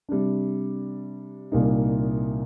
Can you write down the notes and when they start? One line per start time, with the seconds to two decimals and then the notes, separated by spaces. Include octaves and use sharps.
0.09 C3 G3 D4
1.52 C2 A#2 G3 A#3 D#4